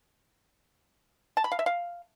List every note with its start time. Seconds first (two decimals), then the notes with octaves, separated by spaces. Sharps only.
1.37 A5
1.44 B5
1.52 F5
1.59 E5
1.66 F5